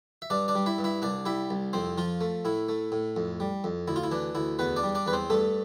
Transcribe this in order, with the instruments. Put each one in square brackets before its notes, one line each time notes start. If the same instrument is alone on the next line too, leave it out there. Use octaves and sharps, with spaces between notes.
[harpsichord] E5
G2 D4 D5
D4 D5
G3
E4 E5
G2
E4 E5
C2 D4 D5
G3 E4 E5
C2
F2 C4 C5
F3 F4
A3
A2 E4
A3
A2
F2
G3
F2
D2 E4
F4
E4
E3 D4
D2 E4
E2 B3 B4
D4 D5
G3
D4 D5
E2 B4
C4 C5
G2 A3 A4